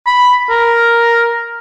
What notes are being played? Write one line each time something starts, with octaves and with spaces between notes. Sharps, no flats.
B5
A#4